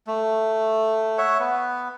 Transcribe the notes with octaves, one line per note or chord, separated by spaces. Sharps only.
A3
C#5 E5 F#5
B3 B4